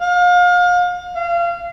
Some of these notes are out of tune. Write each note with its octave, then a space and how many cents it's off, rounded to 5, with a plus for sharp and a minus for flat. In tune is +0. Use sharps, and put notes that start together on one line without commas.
F5 +35
F5 -30